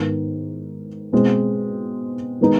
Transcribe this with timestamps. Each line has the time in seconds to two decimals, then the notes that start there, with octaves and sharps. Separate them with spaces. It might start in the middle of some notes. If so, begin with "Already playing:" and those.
Already playing: G#2 D#3 B3
1.13 B2 G#3 C4
2.41 D#3 G#3 B3 D#4